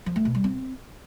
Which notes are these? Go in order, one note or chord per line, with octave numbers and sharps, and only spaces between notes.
F3
A3
B2
G3
C4